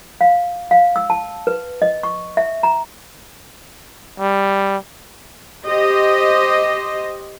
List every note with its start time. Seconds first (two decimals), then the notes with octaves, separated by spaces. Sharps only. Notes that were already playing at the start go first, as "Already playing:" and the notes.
0.21 F5
0.71 F5
0.96 E6
1.10 A5
1.47 B4
1.82 D#5
2.03 C#6
2.37 E5
2.63 A#5
4.19 G3
5.66 G4 C5 D#5